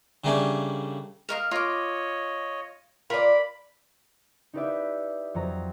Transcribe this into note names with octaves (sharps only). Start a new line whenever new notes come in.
C#3 G3 A3 A#3 C#4 D4
A#4 D#5 F5
F4 C#5 D#5 D6
F4 A#4 D5 B5
D#4 E4 G4 B4 D5 E5
F2 F#3 A#5